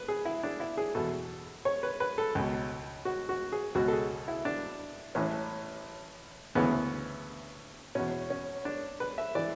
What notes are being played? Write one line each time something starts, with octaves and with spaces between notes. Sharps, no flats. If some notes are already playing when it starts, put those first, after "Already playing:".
Already playing: B4
G#4
E4
D4
E4
G#4
E2 B2 A4
C#5
B4
B4
A4
C#2 B2
F#4
F#4
G#4
C#2 B2 F#4
A4
G#4
E4
D4
A1 A2 E3 C#4
D2 C#3 E3 B3
E2 B2 C#4
C#4
D4
B4
E5
E3 D5